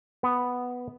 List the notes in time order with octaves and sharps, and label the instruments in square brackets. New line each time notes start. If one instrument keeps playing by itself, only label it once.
[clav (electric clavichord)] B3